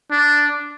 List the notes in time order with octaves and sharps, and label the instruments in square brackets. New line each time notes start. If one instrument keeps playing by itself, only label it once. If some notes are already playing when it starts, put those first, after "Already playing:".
[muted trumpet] D4